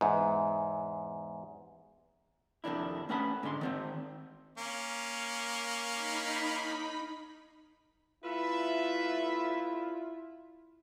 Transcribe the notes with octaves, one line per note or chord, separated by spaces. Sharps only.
E2 G#2
F2 C3 D#3 D4 E4
A3 C#4 B4 F#5 A5 B5
G#2 D3 G#3 C6
D#3 C4 D#4
A#3 C#4
D#4 B5 B6
A3 E4 F4 B4 E5